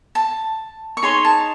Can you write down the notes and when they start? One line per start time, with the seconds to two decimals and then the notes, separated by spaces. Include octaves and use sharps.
0.15 A5
0.97 C#6
1.02 D#4 G#4 C#5 C6
1.25 A5